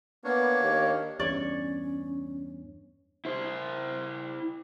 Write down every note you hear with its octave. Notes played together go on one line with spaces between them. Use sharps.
A#3 B3 D4 C#5
D#2
E2 G2 C#4 C#5 D5 C#6
E4 C5